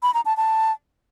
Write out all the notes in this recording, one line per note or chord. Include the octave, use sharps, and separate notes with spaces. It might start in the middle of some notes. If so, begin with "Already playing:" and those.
B5
A#5
A5
A5